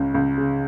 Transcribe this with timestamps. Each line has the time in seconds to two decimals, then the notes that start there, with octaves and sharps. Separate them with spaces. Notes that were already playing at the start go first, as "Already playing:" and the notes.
Already playing: C#2 C#3
0.14 C#2
0.38 C#3